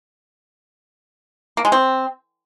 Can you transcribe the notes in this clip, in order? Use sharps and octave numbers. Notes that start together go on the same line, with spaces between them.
A#3
G#3
C4